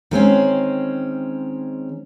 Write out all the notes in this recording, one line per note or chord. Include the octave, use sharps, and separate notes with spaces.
D#3 G#3 C4 C#4